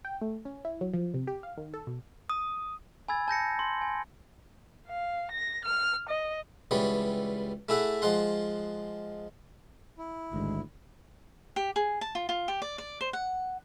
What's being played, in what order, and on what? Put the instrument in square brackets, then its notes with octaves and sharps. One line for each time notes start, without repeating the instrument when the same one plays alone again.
[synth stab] G5
A3
C#4
E4
F#3
F3
C3
G4
F5
D#3
A4
B2
[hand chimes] D#6
[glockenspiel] G#5 B5 E6 G#6 A6
A5 G6 A#6 C#7
C6
G#5
[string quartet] F5
A#6
F6
D#5
[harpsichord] C#2 E3 G3 B3 C#5
A3 E4 G#4 E5 F#5
F3 G#3 F#5 C6
[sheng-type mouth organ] E4
[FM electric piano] A1 G#2 D#3 [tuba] D2 [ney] G#3
[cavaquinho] G4
G#4
A5
F4
F4
G4
D5
D5
C5
F#5